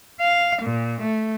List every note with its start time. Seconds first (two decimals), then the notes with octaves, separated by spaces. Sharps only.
0.21 F5
0.62 A#2
1.02 A3